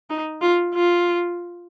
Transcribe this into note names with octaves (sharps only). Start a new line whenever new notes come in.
D#4
F4
F4